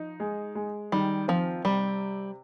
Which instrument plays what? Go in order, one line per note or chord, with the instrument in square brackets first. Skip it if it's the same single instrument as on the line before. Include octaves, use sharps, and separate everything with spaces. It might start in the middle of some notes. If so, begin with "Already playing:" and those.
Already playing: [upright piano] F3 D#4
G#3
G#3
[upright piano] D#3 [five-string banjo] G3
[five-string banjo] F3 [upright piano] C4
[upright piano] C3 [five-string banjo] G3